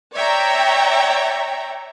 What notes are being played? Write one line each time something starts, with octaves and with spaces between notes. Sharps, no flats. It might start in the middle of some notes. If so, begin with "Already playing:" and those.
C#5 D5 E5 G5 A#5